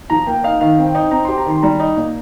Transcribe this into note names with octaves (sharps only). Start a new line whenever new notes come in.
F3 A#5
A#3 G5
D#4 F5
D#3 F5
C4
G5
D#4
C4 A#5
G4 C6
A#5
D#3 C6
G3 A#5
D#4
A#2